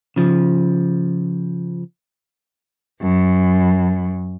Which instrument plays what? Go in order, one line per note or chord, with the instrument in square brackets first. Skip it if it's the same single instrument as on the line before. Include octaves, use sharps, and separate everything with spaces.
[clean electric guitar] C#3 F3
[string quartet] F#2